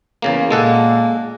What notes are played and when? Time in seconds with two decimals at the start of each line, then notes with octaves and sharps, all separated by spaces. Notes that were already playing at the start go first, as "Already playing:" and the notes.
0.22 E2 C#3 A#3
0.51 A#2 G#3 A#3 A4 F#5